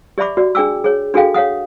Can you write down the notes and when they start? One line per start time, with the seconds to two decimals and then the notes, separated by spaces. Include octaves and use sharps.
0.18 G4 D5 E5 B5 D6
0.37 F#4 D5
0.55 D4 G#4 G5 D6 E6
0.84 G#4 C#5
1.14 D4 F#4 G#4 A4 F5 G5
1.34 C#5 F5 F#5 D#6